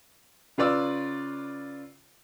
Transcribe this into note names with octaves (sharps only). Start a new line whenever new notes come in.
C#3 F4 B4 D5 E6